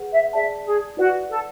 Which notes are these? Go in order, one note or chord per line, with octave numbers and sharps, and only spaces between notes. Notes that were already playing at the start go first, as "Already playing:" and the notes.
Already playing: G#4 B4 F#5
E5
G#4 D5 E5 A5
G#4
E4 F#4 B4 D5 F#5
A4